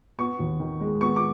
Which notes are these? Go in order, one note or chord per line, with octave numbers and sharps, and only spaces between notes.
B3 C#6
D#2
D#3
G#3
B3 C#6
D6